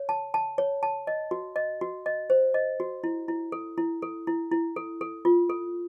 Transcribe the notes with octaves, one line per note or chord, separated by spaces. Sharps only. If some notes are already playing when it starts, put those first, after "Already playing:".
Already playing: C#5
A5
A5
C#5
A5
D#5
F#4
D#5
F#4
D#5
C5
D#5
F#4
E4
E4
A4
E4
A4
E4
E4
A4
A4
F4
A4